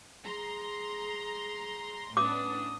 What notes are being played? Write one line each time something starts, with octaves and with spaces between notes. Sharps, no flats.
G#4 A#5 C6
A2 B3 C#4 D4 D6 D#6